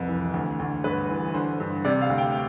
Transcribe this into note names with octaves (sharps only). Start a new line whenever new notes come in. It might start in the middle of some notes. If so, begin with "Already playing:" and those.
Already playing: C2 F2 B4
E3
D2
D2
G2 B4
E3
D3 C5
G2
C3 D5
F5
D2
G5